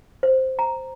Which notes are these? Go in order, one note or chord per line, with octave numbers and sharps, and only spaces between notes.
C5
A#5